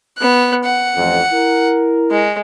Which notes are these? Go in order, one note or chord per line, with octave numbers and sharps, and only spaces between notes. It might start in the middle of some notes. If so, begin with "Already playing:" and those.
B3 F#6
F#5
A1 F2
E4 A#4
G#3